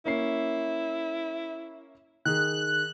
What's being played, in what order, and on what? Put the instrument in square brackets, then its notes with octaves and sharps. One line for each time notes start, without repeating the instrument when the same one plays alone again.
[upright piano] A#3 C#4 C7 [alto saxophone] E4
[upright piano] D#3 G#4 [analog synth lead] F#6